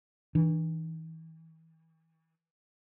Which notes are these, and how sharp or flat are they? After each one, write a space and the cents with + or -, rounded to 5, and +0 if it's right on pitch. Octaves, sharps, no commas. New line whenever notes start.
E3 -35 D4 +30